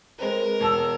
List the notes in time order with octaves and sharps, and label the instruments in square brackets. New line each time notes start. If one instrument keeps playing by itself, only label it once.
[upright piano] G#3 C4 B4 [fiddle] A#4
[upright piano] E1 A5 E6